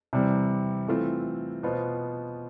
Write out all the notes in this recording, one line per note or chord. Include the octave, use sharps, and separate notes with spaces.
C3 E3 G3 C4
E3 A3 C4 F4
B2 B3 F4 C5